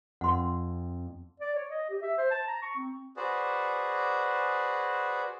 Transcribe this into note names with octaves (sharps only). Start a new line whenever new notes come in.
F2 F#5 C6
D5
C#5
D#5
G4
E5
C5
A5
A#5
C#6
C4
F#4 G#4 B4 C5 D5